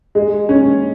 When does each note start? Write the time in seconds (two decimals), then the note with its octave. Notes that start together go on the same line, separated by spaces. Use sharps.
0.15 G#3
0.49 C#4